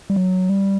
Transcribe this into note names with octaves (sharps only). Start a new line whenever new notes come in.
G3
F#3
G3